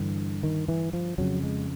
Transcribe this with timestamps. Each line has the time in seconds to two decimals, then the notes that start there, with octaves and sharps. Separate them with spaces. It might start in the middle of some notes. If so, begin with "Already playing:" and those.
Already playing: G2 D3 E3
0.43 D#3
0.68 E3
0.93 F3
1.18 F2 C#3 F#3
1.43 G#3